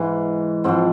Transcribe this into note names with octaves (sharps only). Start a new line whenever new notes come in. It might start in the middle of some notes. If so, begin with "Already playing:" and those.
Already playing: G#2 E3
G#2 F3 C4